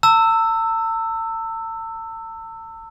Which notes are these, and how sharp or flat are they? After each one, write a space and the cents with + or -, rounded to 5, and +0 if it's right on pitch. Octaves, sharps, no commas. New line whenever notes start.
A5 +45 E6 +0